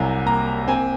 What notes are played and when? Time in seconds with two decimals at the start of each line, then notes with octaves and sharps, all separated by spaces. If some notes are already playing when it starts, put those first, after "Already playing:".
Already playing: C2 C3 F#3 G#5 A#5
0.26 A#3 A#5
0.68 C4 G#5